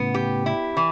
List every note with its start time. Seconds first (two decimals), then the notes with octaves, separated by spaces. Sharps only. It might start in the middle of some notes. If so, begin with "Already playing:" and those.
Already playing: A2 C#3 B3
0.14 G4
0.46 E4
0.77 E3